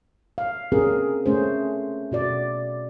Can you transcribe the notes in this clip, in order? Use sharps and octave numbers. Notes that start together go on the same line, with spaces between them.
F5
C4 C#4 G#4 A#4
A3 C#4 G#4 C5
B2 F#4 D5